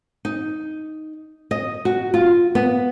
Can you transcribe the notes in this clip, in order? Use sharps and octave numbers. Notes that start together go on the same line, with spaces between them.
D#4
D#5
F#4
F4
B3